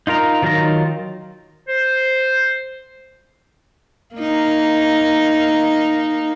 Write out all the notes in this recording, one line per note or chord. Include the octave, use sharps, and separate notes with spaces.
D#4 F4 A#4 A#5
D#3 F#3 D#4 F4 A#5
C5
A#3 D#4